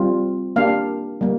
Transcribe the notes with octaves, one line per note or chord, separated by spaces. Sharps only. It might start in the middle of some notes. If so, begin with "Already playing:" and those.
Already playing: G3 C4 F4
A#3 D4 G4 F5
G3 A#3